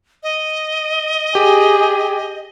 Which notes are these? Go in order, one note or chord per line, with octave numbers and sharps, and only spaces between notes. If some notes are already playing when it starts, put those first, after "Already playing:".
D#5
G4 G#4